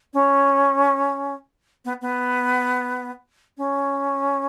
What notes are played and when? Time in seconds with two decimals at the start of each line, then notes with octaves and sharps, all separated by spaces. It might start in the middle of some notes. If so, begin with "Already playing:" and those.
0.13 C#4
1.85 B3
2.01 B3
3.57 C#4